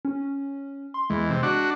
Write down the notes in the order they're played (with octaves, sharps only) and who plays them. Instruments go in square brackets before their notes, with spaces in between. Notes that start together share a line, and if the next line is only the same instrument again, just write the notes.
[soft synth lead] C#4
C6
[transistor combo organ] E2 [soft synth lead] G#3
[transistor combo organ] C3
D4 F#4